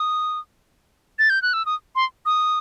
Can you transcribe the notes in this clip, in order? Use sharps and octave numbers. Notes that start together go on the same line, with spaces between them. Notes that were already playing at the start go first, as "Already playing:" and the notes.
Already playing: D#6
A6
G6
F#6
E6
D#6
C6
D#6